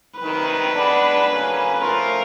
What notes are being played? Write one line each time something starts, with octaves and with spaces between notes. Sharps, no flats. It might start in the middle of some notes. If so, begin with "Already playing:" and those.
D2 C3 D#3 B4
G#3 B3 D4
D2 C#3 F#3 A#3 C#4
F3 A3 C#4 F4 A#4